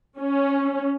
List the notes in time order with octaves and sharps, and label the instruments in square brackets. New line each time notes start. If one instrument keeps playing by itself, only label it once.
[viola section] C#4